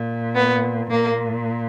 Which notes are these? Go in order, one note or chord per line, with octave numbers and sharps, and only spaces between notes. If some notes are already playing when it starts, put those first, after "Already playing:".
Already playing: A#2
B3
A#2 A#3